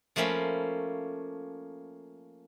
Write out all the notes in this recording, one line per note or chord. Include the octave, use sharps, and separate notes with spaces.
F3 A3 A#3 C#4 B5